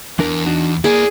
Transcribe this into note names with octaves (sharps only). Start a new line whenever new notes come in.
E2 E3 D4 A#4
D4 D#4 F#4
A#3 E4 G#4 D5